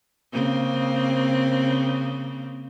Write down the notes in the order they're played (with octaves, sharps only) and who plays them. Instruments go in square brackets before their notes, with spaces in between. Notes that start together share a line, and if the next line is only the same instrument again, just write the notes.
[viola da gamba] C#3 A#3 C4